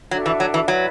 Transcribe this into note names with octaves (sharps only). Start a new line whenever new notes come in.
F#3 D4 F#4 A4 E5
E3
F#3
E3
F#3 E4 B4 D5